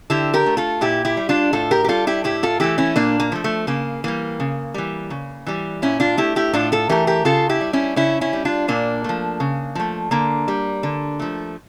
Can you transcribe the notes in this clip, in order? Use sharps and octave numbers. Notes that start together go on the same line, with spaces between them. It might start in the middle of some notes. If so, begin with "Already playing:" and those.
D3 E4 G4
G4 A#4
A3
F4 A4
A#2 E4 G4
E4 G4
G3
D4 F4
A2 F4 A4
G4 A#4
G4
G3 F4 A4
E4 G4
A2 E4 G4
F4 A4
E3 A3 E4 G4
C#4 E4
A#2 A#3 D4
A#3
F3 A3
A3
C#3 A#3
E3 G3 A#3
C#3
E3 G3
C#3
E3 G3
A#2 C#4 E4
D4 F4
A3 E4 G4
E4 G4
A2 D4 F4
F4 A4
E3 A3 G4 A#4
G4 A#4
C#3 F4 A4
E4 G4
G3
C#4 E4
C#3 C#4 E4
C#4 E4
G3
D4 F4
A#2 A#3 D4
F3 A3
C#3
F3 A3
D3 A#3
G3
D3
F3 A3